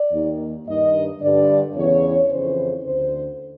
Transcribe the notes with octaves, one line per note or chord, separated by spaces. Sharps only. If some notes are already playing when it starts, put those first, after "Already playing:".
Already playing: D5
D#2 D#3
G2 D#3 D#5
G2 D3 D5
E2 C#3 E3 C#5
F2 C#3 E3 C5
D2 D3 C5